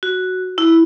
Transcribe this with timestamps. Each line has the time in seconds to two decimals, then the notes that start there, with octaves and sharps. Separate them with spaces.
0.03 F#4
0.58 E4